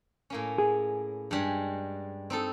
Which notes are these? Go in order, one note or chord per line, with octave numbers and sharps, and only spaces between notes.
A2 A#3 C#4
G#4
G2 G3 G#3
C4 D#4 A4